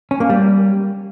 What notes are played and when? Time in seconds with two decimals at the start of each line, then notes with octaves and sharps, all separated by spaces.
0.11 C#4
0.20 A#3
0.30 G3